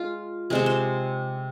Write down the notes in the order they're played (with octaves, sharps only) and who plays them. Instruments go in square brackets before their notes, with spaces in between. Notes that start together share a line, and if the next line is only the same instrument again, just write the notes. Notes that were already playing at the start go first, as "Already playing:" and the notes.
Already playing: [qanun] G#3 F4
C3 G#3 C4 G#4
C5